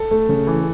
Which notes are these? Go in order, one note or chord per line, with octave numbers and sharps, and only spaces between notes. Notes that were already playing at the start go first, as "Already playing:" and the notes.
Already playing: A4
A3
C#3
E3